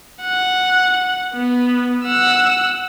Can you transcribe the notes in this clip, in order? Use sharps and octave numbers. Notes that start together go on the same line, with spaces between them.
F#5
B3
F#5 E6